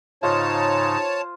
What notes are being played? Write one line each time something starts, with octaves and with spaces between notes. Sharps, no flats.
G#2 C#3 D#4 F4 C5 C#5 A5